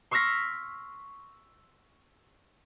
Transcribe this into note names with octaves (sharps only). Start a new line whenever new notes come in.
C6 C#6 E6 F6 A#6 B6